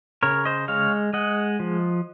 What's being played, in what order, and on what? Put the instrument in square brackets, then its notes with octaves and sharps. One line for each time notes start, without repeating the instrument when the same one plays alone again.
[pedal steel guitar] C#3 A#4 C#5
C5 D#5
G#3 C#5 F5
G#3 D#5 F#5
F3